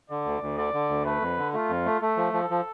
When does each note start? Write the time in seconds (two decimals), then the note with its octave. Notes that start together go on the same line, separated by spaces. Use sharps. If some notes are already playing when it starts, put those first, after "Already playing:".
0.10 D3 D5
0.25 D2
0.41 D2
0.57 D3 D5
0.73 D3
0.89 D2
1.05 A3 B4
1.21 F2
1.38 D3
1.53 A3 F4
1.69 F2
1.85 A3
2.01 A3 A4
2.17 F3
2.33 F3
2.50 F3